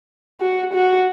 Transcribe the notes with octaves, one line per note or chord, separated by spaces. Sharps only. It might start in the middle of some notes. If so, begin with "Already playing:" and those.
F#4
F#4